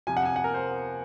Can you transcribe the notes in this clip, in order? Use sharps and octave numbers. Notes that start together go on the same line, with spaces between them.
F2 C3 F3 G#5
F#5
G#5
F#5
A#4
C5